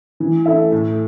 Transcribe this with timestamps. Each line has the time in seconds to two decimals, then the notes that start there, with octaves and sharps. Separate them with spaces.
0.20 E3
0.46 A3 E4 A4 E5
0.72 A2